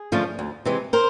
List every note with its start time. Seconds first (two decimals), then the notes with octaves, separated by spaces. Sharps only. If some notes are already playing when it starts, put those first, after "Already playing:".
Already playing: G#4
0.12 D3 F3 A3 C#4
0.39 D2
0.65 C3 E3 G#3
0.93 A#4 C5